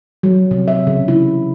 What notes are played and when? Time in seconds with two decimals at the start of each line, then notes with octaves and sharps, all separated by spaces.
0.23 F#3
0.51 C3
0.68 E5
0.87 C#3
1.08 E4